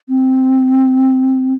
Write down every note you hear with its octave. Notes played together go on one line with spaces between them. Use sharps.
C4